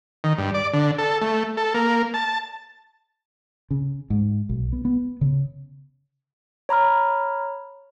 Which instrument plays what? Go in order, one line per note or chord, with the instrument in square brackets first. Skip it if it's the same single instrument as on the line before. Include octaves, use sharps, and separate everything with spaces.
[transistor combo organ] D#3
G2
D5
D3
A4
A3
A4
A#3
A5
[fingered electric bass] C#3
G#2
B1
B3
B3
C#3
[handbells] C#5 A#5 B5 F6